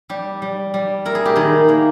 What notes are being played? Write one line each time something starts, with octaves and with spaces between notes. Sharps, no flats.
G3 G4
G3
G3
E4 A#4
G#4
G4
D#3 G#4
A#3